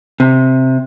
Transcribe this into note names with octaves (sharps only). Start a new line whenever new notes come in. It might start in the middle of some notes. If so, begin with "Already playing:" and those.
C3